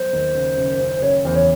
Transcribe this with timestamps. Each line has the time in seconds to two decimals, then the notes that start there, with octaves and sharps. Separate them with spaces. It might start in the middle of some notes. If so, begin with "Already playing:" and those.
Already playing: F#3 B3 C5
0.13 D#2
0.35 C#3
0.57 F#1
0.81 C#3
1.02 F#1 C#5
1.25 E2 C5
1.36 C#5